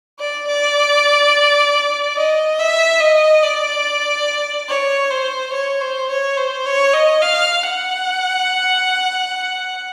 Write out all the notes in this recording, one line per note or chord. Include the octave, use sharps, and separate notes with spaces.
D5
D5
D#5
E5
D#5
D5
C#5
C5
C#5
C5
C#5
C5
C#5
D#5
F5
F#5